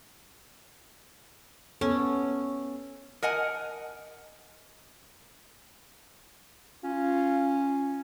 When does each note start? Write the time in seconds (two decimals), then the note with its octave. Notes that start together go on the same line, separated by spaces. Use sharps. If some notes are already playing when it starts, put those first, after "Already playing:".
1.81 B3 C#4 A4
3.23 A#4 D#5 F#5 G#5
6.84 C#4 F4